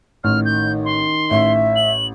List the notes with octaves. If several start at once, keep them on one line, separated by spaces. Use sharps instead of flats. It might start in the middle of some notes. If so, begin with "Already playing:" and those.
A1 D#3 F6
G6
C6
A1 E5
F#7